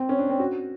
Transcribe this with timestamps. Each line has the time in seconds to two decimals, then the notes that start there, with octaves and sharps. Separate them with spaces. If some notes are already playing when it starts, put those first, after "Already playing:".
Already playing: C4
0.09 C#4
0.19 D4
0.30 C4
0.40 F#4